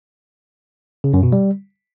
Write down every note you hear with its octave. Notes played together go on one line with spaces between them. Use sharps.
C#3
F#2
B2
G3